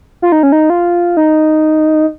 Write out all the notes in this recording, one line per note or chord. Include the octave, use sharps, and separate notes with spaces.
F4
D#4
C#4
D#4
F4
D#4